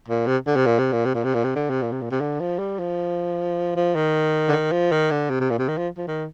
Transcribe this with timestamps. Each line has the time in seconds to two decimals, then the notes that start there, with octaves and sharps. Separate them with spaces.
0.08 A#2
0.27 C3
0.47 D3
0.56 C3
0.66 A#2
0.79 C3
0.92 A#2
1.05 C3
1.15 A#2
1.24 C3
1.34 A#2
1.44 C3
1.56 D3
1.70 C3
1.82 A#2
1.92 C3
2.02 A#2
2.11 C3
2.21 D3
2.40 F3
2.59 G3
2.79 F3
3.76 F3
3.95 D#3
4.49 D3
4.52 D#3
4.72 F3
4.92 D#3
5.11 D3
5.30 C3
5.40 C3
5.50 A#2
5.59 C3
5.68 D#3
5.78 F3
5.98 F3
6.08 D#3